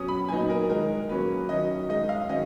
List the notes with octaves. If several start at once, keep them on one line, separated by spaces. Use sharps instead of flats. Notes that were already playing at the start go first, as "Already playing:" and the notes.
Already playing: B2 F#3 C#4 D#6
B5
A#2 F#3 B3 D#4 G#5
A#4
D#3 G#3 D#4 A#4
A#2 F#3 A#3 C#4 B4
D#3 F#3 C#4 D#5
D#3 G#3 D#4 D#5
F5
D#3 F#3 C#4 D#5